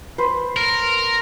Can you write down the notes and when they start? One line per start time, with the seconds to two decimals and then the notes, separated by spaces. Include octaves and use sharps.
0.18 B4 C5
0.57 A#4